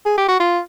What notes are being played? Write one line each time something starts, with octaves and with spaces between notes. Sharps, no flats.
G#4
G4
F#4
F4